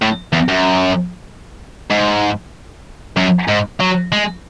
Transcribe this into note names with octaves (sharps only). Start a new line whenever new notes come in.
A2
E2
F#2
G#2
F#2
G#2
F#3
G#3